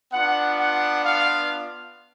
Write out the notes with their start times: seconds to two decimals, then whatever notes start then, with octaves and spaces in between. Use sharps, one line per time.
0.12 B3 D4 F4 F#5
0.58 F#5
1.05 F5